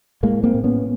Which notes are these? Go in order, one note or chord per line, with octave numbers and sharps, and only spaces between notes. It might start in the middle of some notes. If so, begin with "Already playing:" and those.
A2 G#3 A#3
A#3 C4
A2
B3 C#4